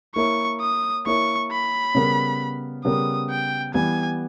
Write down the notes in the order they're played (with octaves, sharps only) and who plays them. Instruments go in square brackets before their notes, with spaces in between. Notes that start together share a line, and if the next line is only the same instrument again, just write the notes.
[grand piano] A#3 E4 A#4 C#5 [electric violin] C#6
[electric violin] D#6
[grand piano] A#3 E4 A#4 C#5 [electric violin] C#6
[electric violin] B5
[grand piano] C#3 G3 B3 G4 A#4
[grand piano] C#3 G3 B3 G4 A#4 [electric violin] D#6
[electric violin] G5
[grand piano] E3 G3 B3 [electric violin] G#5